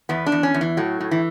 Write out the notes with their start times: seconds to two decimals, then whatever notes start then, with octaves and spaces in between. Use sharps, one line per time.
0.09 E2 B3
0.26 D4
0.32 E2
0.43 C#4
0.54 E2
0.61 E3
0.77 A2 F#3
1.00 A2
1.11 E3